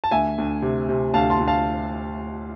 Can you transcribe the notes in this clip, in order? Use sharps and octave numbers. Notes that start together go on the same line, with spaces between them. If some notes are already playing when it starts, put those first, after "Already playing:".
A5
D2 E5 G#5
D2
C3
C3
D2 F5 A5
A5 C6
D2
F5 A5